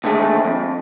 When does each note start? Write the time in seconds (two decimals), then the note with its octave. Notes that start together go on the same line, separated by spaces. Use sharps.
0.04 D#2 D3 G#3 A3 G#4
0.44 F2